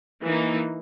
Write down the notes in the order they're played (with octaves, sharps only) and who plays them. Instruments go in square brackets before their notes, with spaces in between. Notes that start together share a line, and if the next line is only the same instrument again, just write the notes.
[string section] E3 A#3 D#4